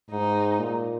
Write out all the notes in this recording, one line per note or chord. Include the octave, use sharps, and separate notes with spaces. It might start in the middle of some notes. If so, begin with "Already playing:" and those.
G#2 D#4
A#2